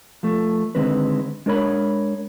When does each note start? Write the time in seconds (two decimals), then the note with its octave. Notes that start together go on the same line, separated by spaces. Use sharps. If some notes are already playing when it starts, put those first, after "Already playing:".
0.23 F3 A3
0.75 D3 D#3 G#3 C4 B4
1.46 G#3 D4 A#4 C#5 B5